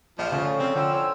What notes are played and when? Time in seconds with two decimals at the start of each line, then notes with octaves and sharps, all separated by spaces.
0.19 A#1 F3 F4 G5
0.32 D2 C#3 C#4 F4 G#4 A4
0.59 C#3 C4
0.75 D3 F3 F#4 C5 G5 B5 E6
0.94 C#5